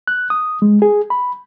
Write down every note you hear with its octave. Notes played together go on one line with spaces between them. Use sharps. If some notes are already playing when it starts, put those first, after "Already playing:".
F#6
D#6
G#3
G#4
B5